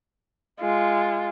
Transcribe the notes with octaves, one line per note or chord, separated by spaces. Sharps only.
G#3 F4